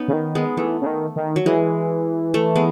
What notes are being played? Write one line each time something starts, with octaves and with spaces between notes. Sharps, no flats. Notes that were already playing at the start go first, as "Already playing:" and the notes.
Already playing: B3 C#4 D#4
C#3
D#3
G#3 B3
E3 A3
C#3
D#3
D#3
F#3
E3 G#3
A3
G#3 B3